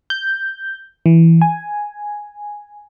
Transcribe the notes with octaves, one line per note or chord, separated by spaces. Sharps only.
G6
E3
G#5